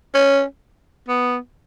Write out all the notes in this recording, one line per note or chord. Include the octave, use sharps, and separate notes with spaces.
C#4
B3